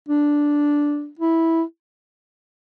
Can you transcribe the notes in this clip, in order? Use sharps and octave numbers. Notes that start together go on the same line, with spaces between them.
D4
E4